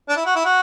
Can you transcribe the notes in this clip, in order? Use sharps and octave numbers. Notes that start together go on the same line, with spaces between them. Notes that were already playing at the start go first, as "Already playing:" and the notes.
D4
E4
F#4
E4
F#4